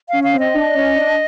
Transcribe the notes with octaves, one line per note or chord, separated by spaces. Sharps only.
C#4 F5
F5
C4
D#5
D4
C#4
D4